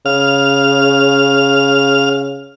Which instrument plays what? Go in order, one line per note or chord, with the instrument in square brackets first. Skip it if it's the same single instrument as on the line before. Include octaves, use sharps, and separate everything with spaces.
[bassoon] C#3 [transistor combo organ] F5 F6